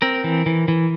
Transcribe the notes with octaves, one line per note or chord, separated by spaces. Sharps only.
C4 A#4
E3
E3
E3